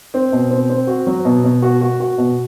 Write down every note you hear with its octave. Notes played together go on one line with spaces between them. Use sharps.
C4
B2
C4
C4
F#4
F#3
B2
B2
F#4
F#4
F#4
B2